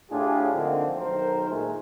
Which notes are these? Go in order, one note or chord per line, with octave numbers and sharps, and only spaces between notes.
A2 D4 F4 G4 G#4
D3 F3 A3 A#3 C4 D#4
B1 D#3 A#4 C5
A#2 D#3 G#3 A3